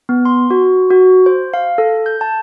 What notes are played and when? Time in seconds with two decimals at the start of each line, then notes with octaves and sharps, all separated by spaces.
0.09 B3
0.25 C6
0.51 F#4
0.90 F#4
1.26 C5
1.54 F5
1.78 A4
2.06 G6
2.21 A5